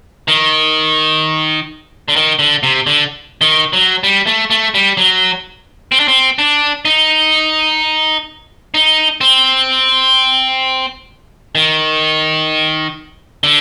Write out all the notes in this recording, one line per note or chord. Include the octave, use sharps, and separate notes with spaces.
D#3
D3
D#3
D3
C3
D3
D#3
F#3
G3
A3
A3
G3
F#3
C4
D4
C4
D4
D#4
D#4
C4
D#3
D3